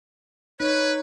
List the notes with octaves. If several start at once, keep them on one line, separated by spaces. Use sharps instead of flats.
D#4 B4 C#5